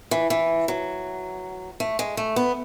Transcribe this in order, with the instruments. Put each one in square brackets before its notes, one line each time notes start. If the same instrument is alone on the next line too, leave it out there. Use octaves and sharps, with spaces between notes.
[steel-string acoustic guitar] E3
E3
F#3
A3
G#3
A3
B3